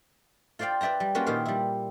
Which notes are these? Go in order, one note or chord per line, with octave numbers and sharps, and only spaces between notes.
F4 C5 D5 F5 G5
B4 D5 E5 G5 A#5
G3
A#3 C#4 F4 F#4 A#4 B4
A#2 D#3 F4 G4 C5 F5
G3 E4